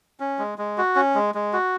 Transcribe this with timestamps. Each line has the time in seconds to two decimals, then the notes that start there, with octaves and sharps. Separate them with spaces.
0.20 C#4
0.39 G#3
0.58 G#3
0.78 F#4
0.96 C#4
1.15 G#3
1.35 G#3
1.53 F#4